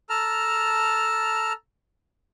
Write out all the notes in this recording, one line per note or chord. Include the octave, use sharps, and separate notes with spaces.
A4 A5 A#5 F6